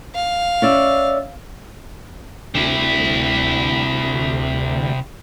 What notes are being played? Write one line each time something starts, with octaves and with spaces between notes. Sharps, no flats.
F5
C#4 D5 E5
D2 C3 E4